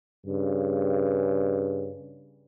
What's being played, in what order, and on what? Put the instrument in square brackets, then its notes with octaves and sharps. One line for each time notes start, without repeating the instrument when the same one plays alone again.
[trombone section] G2 C#3